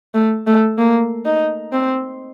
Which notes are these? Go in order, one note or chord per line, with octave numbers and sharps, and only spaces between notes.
A3
A3
A#3
D#4
C4